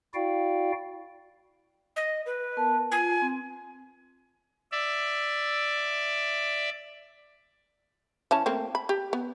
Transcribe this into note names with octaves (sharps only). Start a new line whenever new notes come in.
E4 F#4 D5 F5 G5
D#5
B4
B3 A#4 A5
F4 G#5
C4
D5 E5
E3 C#4 A5
A3 A#3 C4
B5
G4
B3